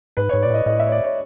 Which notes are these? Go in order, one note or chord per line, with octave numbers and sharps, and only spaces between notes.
G#2 B4
G#2 C#5
A#2 D5
A2 D#5
A2 D#5
E5
C#5
D5
C#5